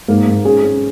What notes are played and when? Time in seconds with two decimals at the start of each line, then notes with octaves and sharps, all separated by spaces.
0.08 G#2 A#3 A#4
0.27 G#2
0.45 C#4 G#4
0.63 C#4